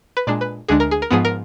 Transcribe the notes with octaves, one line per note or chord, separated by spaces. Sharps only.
B4
A#2 G#3 D4 D5
B4
D2 D3 G#3 D4 G#4
A#4
G#4
A#4
G#2 F3 B3 G#4
A#4